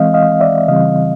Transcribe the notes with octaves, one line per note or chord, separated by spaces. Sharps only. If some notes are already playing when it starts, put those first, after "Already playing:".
Already playing: E3 G#3 C4 D#5 F5
D#5 F5
D5 E5
C#3 E3 G3 C4 D#5 F5